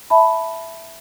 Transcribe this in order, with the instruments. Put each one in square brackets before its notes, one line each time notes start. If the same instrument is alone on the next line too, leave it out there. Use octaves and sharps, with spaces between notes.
[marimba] E5 A5 B5